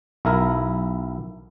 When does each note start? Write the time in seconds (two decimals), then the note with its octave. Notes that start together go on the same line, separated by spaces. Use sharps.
0.25 B1 E4 A#4